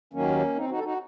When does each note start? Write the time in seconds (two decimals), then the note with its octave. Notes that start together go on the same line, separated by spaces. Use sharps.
0.13 D#2 D#3 F#3 A#3 C#4
0.55 C4 D#4
0.69 D#4 F#4
0.78 A4
0.84 D#4 F#4